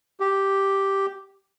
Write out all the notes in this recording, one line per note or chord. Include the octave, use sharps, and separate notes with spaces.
G4